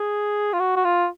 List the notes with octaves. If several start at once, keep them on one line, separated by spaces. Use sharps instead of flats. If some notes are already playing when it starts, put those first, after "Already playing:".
Already playing: G#4
F4
F#4
F#4
F4